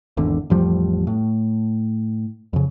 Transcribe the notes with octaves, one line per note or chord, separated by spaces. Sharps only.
G#1 E2 D3
A1 F2 F3 G3
A2
F2 C#3